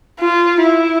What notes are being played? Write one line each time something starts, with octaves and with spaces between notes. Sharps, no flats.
F4
E4